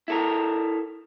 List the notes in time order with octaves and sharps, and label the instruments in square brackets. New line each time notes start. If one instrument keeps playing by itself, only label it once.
[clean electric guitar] E4 A4 A#4